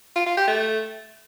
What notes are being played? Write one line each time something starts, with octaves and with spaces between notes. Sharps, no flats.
F4
F4
G4
A3